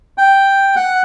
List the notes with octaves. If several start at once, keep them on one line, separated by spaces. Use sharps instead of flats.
G5
F#5